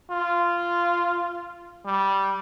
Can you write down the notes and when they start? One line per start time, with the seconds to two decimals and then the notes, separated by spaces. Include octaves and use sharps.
0.11 F4
1.85 G3